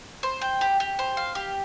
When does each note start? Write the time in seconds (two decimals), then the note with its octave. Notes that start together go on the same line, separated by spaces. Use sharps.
0.23 C5
0.41 G5
0.61 G4
0.80 G4
0.99 C5
1.17 F5
1.35 G4